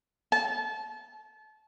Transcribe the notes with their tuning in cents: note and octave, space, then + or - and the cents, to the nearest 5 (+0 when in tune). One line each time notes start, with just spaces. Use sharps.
A5 -30